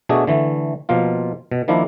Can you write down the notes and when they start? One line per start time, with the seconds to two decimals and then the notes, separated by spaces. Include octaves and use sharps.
0.09 B2 A3 D4 F#4 G#4
0.27 D3 E3 A3
0.89 B2 F3 A#3 F4
1.51 B2
1.68 D#3 F3 A#3 D4 E4